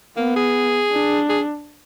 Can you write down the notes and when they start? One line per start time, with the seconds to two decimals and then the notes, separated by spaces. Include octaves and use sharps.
0.17 A#3 B3
0.36 G#4
0.92 D4
1.29 G#4